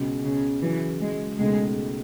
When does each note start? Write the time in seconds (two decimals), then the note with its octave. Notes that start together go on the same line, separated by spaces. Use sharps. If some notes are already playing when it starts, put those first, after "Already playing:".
Already playing: C#2 B2 G#3 C#4 F#4
0.24 C#3
0.62 C#3 E3 F#3 C#4 G#4
1.01 G#3
1.39 C#2 B2 G#3 A3 D#4